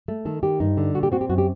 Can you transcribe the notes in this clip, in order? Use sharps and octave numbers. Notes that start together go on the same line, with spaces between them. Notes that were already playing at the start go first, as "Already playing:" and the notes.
A3
D#3 A4
D#3 G4
G2 D#4
D3
A#2 F#4
G4
C4 F#4
G4
F#2 F#4
G4